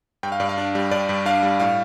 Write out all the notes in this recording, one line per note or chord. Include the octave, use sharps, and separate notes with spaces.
G2 G5
F5
G2 D5
F5
D4
G3
G2 D5
G2
D4 F5
G3
A2 F5